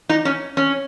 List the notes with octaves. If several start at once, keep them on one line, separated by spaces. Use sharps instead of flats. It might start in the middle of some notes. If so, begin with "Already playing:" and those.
D#4
C#4
C#4